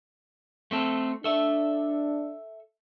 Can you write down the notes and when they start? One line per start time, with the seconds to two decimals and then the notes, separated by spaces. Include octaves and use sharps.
0.71 A3 C4 A4
1.24 D4 A4 E5